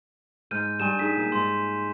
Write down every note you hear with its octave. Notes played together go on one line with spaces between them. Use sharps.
G#2 F6 G6 D#7
G2 G#5 D#7 E7
D#4 G#4 B6
A#2
G#2 C6